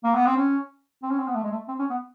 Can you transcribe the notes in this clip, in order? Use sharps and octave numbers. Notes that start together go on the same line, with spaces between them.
A#3
B3
C4
C#4
C4
C#4
C4
B3
A3
G#3
A3
C4
C#4
B3